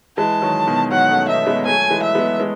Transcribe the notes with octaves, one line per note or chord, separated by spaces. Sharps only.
E3 G#3 A5
D#3 F#3
B2 D#3
D#3 F#3 F#5
A3 C#4
B3 D#4 E5
G#3 B3
F#3 A3 G#5
E3 G#3
E5
G#3 B3
G#3